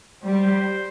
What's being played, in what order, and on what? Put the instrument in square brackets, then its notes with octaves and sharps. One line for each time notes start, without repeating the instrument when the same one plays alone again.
[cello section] G3 [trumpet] C5